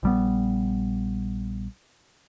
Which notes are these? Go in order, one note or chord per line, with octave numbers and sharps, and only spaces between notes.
A#1 G3 B3